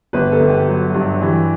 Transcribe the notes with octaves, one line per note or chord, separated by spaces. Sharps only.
G1 B4
A4
G1
G4
F#3
G2
E3 G4